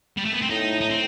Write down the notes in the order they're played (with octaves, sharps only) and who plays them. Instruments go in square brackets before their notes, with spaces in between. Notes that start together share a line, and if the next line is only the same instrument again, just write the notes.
[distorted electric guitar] G3
A3
B3
C4
[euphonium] A2 [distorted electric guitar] D#4
[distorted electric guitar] D#4
C4